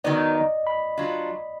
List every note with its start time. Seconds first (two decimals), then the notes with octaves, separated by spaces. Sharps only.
0.04 D#3 F#3 B3 D#4 D5
0.35 D#5
0.67 B5
0.97 F#3 D4 F4